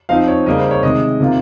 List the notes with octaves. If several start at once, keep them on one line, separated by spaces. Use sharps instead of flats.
F3 C4 D#4 F5
C#5
C#3 G3 A#3 D#5
C5
C#5
C3 D#3 G#3 D#5
C3 D#3 A#3 F4